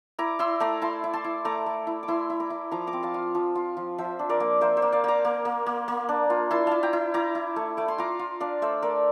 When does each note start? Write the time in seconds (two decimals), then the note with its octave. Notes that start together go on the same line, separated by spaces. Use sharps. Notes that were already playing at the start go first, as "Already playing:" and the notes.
0.19 E4 A#5 D6
0.39 E4 C6 E6
0.60 A3 A#5 D6
0.82 E4 A5 C6
1.04 E4
1.13 A5 C6
1.24 E4
1.45 A3 A#5 D6
1.66 A3
1.87 E4
2.03 D6
2.08 E4 C6 E6
2.30 E4
2.40 A#5 D6
2.50 E4
2.71 F3 A#5 D6
2.87 A#5 D6
2.93 C4
3.03 F5 A5
3.14 F4
3.35 F3
3.55 F4
3.77 F3
3.98 F3 C5 E5
4.19 D4
4.29 A#4 D5
4.40 A#3
4.61 A#3 C5 E5
4.77 C5 E5
4.82 A#3
4.92 D5 F5
5.04 A#3 A#5 D6
5.25 A#3
5.45 A#3
5.66 A#3
5.88 A#3
6.09 D4
6.30 F4
6.51 E4 A5 C6
6.67 E4 F5 A5
6.83 G5 A#5
6.93 E4
7.14 E4 A#5 D6
7.35 E4
7.56 A3
7.77 A3 D6
7.88 C6
7.98 F4 A#5 D6
8.19 F4
8.40 D4 D5 F5
8.62 A3 C5 E5
8.82 A3 A#4 D5